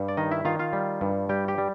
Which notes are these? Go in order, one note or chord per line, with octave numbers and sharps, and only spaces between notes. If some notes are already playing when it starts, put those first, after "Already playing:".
Already playing: G2 G3
D5
D#3 D#4 D#5
E4 E5
D#3 F4 F5
F4 F5
G3
G2
G3 G4 G5
G4 G5
G3